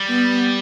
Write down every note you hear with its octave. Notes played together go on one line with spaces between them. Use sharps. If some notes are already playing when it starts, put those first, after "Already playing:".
Already playing: G3
B3